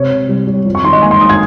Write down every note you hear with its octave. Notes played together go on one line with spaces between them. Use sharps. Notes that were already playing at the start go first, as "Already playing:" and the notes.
Already playing: C3 C#5
C3
G3
G3
F2
C#6
D#3 C6
D#5
A#3 G#5
C6
D#3 D#6
G#6